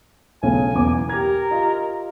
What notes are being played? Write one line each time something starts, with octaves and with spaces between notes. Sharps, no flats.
B1 C#3 A3 G#5
B1 E2 D6
G4 A#4 G#6
F4 G4 D#5